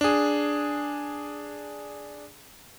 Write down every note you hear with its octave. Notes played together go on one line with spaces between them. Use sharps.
D4 G#4